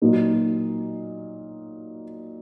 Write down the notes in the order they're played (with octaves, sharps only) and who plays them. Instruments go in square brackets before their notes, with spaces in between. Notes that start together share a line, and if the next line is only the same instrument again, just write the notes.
[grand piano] A#2 F#3 A#3 D#4